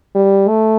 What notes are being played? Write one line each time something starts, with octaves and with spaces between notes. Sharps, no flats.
G3
A3